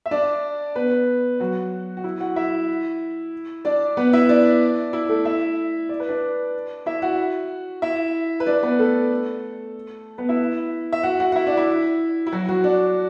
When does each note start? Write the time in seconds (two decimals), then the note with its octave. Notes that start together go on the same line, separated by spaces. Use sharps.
0.06 E5
0.11 D4 D5
0.75 B3 B4
1.40 F#3 F#4
1.97 F#4
2.04 E4
2.20 F#4 F#5
2.36 E4 E5
3.65 D4 D5
3.97 B3 B4
4.13 E4 E5
4.29 D4 D5
4.93 E4
5.09 A3 A4
5.25 E4 E5
5.89 D5
6.00 B4
6.09 D4 D5
6.86 E4 E5
7.02 F#4 F#5
7.82 E4 E5
8.40 B4
8.46 D4 D5
8.63 B3 B4
8.79 A3 A4
10.18 B3 B4
10.29 E4 E5
10.93 E5
11.03 F#4 F#5
11.20 F#4 F#5
11.32 F#5
11.36 E4 E5
11.47 D4
11.57 E4
12.27 E4
12.32 F#3 F#4
12.49 F#3 F#4
12.64 D4